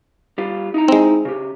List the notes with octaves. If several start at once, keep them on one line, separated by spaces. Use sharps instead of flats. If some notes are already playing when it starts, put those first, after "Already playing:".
G3 F4
D#4 E4 A#5
G#3 C4
C#3 G4